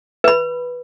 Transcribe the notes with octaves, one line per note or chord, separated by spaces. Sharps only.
B4 B5